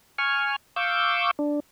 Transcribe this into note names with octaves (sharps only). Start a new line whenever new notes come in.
G#5 C#6 F6
F5 C#6 D6 E6 G6
D4